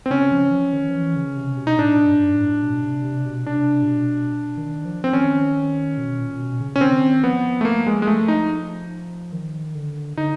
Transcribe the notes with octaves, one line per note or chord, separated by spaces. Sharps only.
C4
C#3 C#4
F3
E3
F3
D#3
F3
E3
C#3
C3
B2
D#4
A2 D4
G2
A2
B2
C3
C3
B2
C3 D4
A#2
B2
D#3
F3
C4
D#3 C#4
B2
A#2
B2
C#3
C#4
D#3 C4
F3 B3
A3
A#3
G#3
G#3
A3
D#4
D#3
D3
D3 D#4